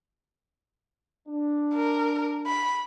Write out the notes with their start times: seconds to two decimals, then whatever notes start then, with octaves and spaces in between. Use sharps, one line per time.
1.28 D4
1.74 A#4
2.47 B5